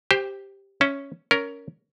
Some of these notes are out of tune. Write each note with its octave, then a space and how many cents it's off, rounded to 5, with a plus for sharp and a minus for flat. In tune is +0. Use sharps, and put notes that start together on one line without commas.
G4 +0 C5 +0 G5 +30
C#4 +0 E5 +0
C#4 +15 A#4 +0